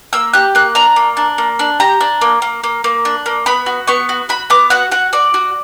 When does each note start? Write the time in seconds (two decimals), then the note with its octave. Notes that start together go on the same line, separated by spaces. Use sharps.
0.13 A#3 E6
0.33 G4 F#6
0.55 A#3 F#6
0.75 D4 A#5
0.96 A#3
1.17 D4
1.38 A#3
1.59 D4
1.80 G4 A#5
2.01 D4
2.21 A#3
2.42 A#3
2.64 A#3
2.84 A#3
3.05 D4
3.26 A#3
3.46 B3 B5
3.66 F#4
3.88 B3 C#6
4.09 F#4
4.29 F#4 B5
4.50 B3 D6
4.70 F#4 F#5
4.92 F#4 F#5
5.13 F#4 D5
5.34 F#4